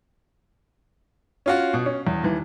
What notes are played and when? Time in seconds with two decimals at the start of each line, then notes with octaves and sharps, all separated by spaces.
1.46 C#4 F4 F#4
1.74 B2
1.86 C#4
2.07 E2
2.23 D#2 E3